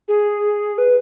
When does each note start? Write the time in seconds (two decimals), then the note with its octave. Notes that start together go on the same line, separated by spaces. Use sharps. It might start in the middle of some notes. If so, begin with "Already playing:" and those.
0.08 G#4
0.78 B4